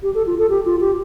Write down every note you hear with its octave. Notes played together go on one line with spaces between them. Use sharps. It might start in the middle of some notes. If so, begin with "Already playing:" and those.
G4
A4
F4
A4
G4
F4
G4